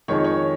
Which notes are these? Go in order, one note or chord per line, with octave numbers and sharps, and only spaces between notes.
F2 D#3 G#3 C#5
C#5